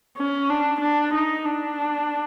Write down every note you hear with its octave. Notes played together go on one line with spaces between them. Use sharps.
C#4
D4
D4
D#4
D4